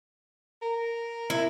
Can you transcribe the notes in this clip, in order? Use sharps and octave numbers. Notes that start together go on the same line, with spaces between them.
A#4
E4